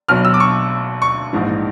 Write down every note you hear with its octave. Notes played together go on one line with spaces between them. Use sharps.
B1 B2 F#3 F6
E6
D6
C#6
C#6
A#1 G#2 E3